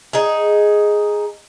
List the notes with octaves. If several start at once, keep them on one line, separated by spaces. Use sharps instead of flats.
D#4 G#4